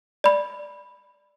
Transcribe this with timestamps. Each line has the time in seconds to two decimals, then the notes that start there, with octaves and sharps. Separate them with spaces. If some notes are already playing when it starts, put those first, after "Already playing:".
0.24 D5 B5